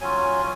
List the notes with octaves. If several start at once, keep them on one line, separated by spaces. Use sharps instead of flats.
F#3 C#4 F4 G#5